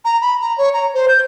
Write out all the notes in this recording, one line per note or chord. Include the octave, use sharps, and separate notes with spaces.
A#5
B5
A#5
C#5
A#5
C5
G6